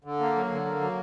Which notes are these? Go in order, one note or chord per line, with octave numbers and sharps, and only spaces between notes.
D3
A#3
F#3
D3
A#3
F#3